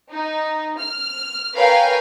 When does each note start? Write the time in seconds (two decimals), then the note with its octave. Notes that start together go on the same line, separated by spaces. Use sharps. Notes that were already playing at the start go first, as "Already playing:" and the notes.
0.10 D#4
0.78 F6
1.53 A#4 B4 C#5 F5 G5 G#5